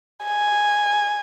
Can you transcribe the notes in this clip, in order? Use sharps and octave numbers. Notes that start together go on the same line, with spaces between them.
G#5